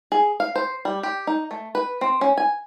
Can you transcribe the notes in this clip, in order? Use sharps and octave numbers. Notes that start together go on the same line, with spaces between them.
G#4
F5
C5
G3
G4
D#4
A3
B4
C4
C#4
G#5